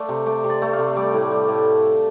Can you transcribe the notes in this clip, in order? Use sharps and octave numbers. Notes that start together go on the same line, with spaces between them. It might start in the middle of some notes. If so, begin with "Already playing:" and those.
Already playing: A3 C5 D5 F5
C3
A3 D5
C3
D5
A3
F5
C3
G3 D5
A2
G3
A2